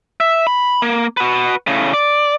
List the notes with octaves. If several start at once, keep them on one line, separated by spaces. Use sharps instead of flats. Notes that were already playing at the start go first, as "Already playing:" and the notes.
E5
B5
A#3
F#4 B4
A2 C#3
D5